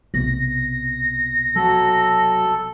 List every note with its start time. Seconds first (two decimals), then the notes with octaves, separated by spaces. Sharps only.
0.14 B1 C3 A#6
1.56 F#3 A4